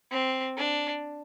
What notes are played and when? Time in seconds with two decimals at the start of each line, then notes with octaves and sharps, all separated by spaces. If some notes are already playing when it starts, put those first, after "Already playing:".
0.11 C4
0.57 D4